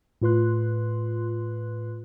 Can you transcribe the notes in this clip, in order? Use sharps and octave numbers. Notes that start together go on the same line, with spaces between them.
A2 F4 B4 C6 F#6